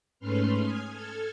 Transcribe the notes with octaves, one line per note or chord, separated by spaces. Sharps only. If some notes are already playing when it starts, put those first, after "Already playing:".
G#2 A3 C#4 B4 C6 F6
G#5 D#6 F6 G#6
A4 F6 G#6